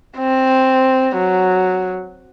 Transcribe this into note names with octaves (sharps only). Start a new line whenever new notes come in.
C4
F#3